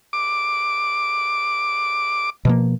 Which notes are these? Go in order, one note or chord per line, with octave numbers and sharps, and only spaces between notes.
D6
B2 F3 A#3